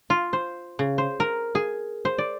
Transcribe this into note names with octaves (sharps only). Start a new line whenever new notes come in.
F4
C5
C#3
C5
A#4
G#4
C5
D5